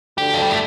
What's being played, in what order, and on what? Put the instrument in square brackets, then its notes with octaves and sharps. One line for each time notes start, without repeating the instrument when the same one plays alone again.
[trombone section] D2 D3 [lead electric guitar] G4
[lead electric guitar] F3
G3
A3